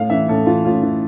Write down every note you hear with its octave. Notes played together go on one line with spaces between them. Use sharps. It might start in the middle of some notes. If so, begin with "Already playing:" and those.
Already playing: A2 F5
E3 E5
A2 A4
E3 F4
A2 F4
E3